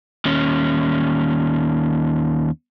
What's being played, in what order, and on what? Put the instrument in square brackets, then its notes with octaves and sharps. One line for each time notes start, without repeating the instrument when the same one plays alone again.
[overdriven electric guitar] D#2 C#4